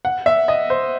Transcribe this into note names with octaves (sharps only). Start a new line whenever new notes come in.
F#5
E5
D#5
C5